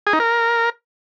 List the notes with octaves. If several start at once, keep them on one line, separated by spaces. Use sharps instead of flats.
G#4
D#4
A#4